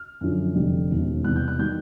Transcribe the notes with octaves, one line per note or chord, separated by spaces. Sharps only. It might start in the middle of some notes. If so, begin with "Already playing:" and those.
Already playing: F6
F#2 D3 F3
F1 F2 D3 G3
E1 D#2 C#3
E2 C3 E3 G3 F#6
G6
F#6
D#3 G3 G6